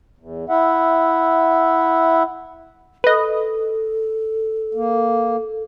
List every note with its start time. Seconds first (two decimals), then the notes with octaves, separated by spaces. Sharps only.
0.19 E2
0.49 E4 E5 F#5
3.04 A4 B4 D#5
4.74 A#3